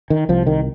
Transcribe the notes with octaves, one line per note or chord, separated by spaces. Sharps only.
D#3
C2 F3
D#3